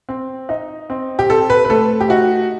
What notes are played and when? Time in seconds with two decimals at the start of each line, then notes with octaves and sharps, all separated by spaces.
0.09 C4
0.49 D#4
0.90 C4
1.19 G4
1.30 C4 A4
1.50 B4
1.65 B4
1.69 A3 A4
2.00 G4
2.09 D#4 F#4